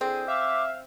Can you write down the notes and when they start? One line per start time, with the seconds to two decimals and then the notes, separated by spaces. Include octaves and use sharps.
0.01 D3 C4 E4 G#4
0.28 E5 F5 D6